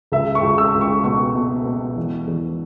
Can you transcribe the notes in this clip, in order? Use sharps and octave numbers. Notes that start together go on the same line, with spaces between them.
C#2 E5
C#6
C#2
E6
C#2
C#6
B2 C#6
B2
B2
E2
E2